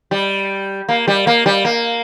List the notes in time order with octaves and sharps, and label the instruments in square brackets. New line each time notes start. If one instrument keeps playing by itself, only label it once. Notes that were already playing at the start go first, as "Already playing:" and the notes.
[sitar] G3
A#3
G3
A#3
G3
A#3